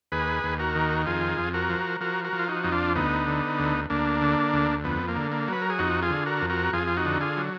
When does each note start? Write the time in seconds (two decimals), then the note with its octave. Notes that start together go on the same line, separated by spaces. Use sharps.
0.12 D#2 G#4 B4
0.44 D#2
0.59 F#4 A#4
0.75 D#3
1.06 F2 F4 G#4
1.38 F2
1.54 F#4 A#4
1.70 F3
2.01 F3 F#4 A#4
2.24 F#4 A#4
2.33 F3
2.39 F4
2.48 D#4 F#4
2.64 F2 D#4
2.72 D4 F4
2.95 D2 B3 D#4
3.27 D3
3.59 D2
3.90 D2 A#3 D4
4.21 D3
4.53 D2
4.84 F2 B3
5.08 A#3
5.16 D3
5.32 A#3
5.48 F#3 B4
5.62 A#4
5.70 G#4
5.79 F2 D#4 F#4
6.02 F4 G#4
6.10 D3
6.26 F#4 A#4
6.42 F2
6.50 F#4 A#4
6.73 F2 F4 G#4
6.87 F4
6.97 D#4 F#4
7.05 D3
7.21 F4 G#4
7.37 F#3